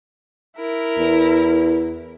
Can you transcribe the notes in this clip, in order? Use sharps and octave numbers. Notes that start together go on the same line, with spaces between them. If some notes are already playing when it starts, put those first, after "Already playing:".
E4 A#4
E2